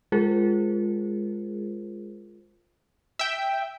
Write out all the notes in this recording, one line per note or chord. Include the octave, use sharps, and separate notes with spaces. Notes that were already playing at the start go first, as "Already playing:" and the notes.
G#3 F4 G#4 A#4 C5
E5 G5